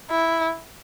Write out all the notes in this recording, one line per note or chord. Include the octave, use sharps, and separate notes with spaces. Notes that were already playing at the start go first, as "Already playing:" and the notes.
E4